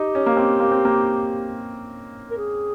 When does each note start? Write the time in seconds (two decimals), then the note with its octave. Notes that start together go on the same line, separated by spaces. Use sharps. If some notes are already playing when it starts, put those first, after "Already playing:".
Already playing: D#4 G4
0.15 C#4
0.26 A#3
0.37 C4
0.60 A#3
0.72 C4
0.85 A#3
2.31 A#4
2.37 G#4